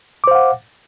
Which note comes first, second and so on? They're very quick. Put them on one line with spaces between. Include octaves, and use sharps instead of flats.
D6 C5 F5 F#5